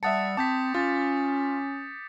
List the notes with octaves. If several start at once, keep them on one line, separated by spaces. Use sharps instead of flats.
G3 E5 F#5 A5 D#6 A6 C#7
C4 A5 D6 G6 B6
C#4 F4 A6